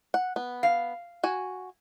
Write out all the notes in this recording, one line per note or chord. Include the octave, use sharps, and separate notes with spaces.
F#5
B3
F5
F#4 G#5